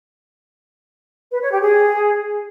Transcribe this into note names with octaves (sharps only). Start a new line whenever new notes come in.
B4
C#5
G4
G#4